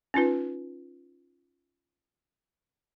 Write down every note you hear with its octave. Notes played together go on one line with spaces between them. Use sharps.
C#4 D#4 F4 B4